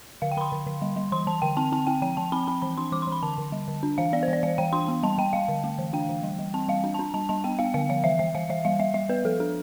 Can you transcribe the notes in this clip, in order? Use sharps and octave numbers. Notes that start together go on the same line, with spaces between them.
D3 F5
G5
D3 B5 C6
D3
D3
G3
G3
E3 C6
E3 A5
D3 G5
C4 A5
C4 A5
C4 G5
F3 G5
F3 A5
C4 B5
C4 B5
E3 B5
D4 C6
E3 D6
C6
E3
B5
D3 A5
D3
G3
D3
D4
E3 F5
B3 D5
C5
E3
D5
E3 F5
E3 G5
D4 C6
B3
G3 A5
G3 G5
G3 F5
D3
A3
E3
D4 G5
E3
G3
G3
C4 A5
G3 F5
D4
D4 A5
G3 A5
G3 A5
B3 G5
B3 F5
D3 F5
F3 F5
E3 E5
E3 E5
E3 F5
E3 E5
G3 F5
G3 E5
G3 E5
B3 B4
F3 A4
D4 A4